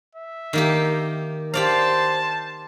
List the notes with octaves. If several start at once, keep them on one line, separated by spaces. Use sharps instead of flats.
E5
D#3 A#3 G4
G4 C5 D5 F5 A5